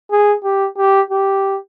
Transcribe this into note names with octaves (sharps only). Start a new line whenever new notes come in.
G#4
G4
G4
G4